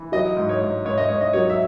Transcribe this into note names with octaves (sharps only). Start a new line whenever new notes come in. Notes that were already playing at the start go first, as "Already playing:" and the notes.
Already playing: E3
F#3 D#5
G#2
C#5
G#2
G#2 C#5
D#5
G#2 C#5
D#5
F#3 C#5
E5